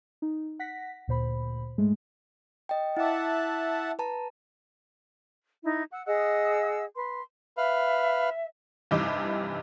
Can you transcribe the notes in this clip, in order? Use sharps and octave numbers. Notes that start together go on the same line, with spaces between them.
D#4
F#5 A#6 B6
D2 A#2 C5 B5
G#2 G#3 A3
D#5 G5
E4 E5 F#5 A5 D6
B4 A5 A#5
D#4 E4
F#5 E6
G#4 D#5 F#5 E6
B4 C6
B4 E5 F5
F1 G2 C3 E3 D#4 D6